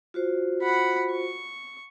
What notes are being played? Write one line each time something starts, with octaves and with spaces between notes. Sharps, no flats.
F4 F#4 C5
F#5 B5
C#6